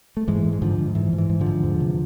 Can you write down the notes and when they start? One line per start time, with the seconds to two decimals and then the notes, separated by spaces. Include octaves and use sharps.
0.17 A3
0.28 G#2 E3 G#3
0.45 G#2
0.53 G#3
0.62 G#2 D3 F3
0.78 G#2
0.95 G#2 E3
1.13 G#2
1.18 E3
1.30 G#2
1.40 D3 F3
1.46 G#2
1.64 E2
1.80 C3